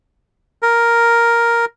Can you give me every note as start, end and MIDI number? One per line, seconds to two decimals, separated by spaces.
0.62 1.65 70